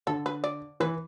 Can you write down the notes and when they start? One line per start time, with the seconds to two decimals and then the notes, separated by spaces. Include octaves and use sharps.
0.07 D3 A4
0.26 B4
0.44 D5
0.80 E3 B4